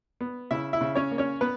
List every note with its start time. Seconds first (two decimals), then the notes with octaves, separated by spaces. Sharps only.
0.21 B3
0.51 C#3 E4 E5
0.73 E4 E5
0.81 C#3
0.95 C#4 C#5
1.11 A#3
1.18 C#4 C#5
1.41 B3 B4